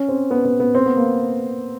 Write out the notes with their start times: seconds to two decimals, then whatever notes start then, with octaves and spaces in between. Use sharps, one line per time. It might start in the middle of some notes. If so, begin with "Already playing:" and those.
Already playing: C#4
0.09 C4
0.31 B3
0.45 B3
0.60 B3
0.75 C4
0.86 B3
0.96 A#3